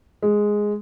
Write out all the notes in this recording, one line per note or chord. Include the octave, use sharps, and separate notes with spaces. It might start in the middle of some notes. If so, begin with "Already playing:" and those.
G#3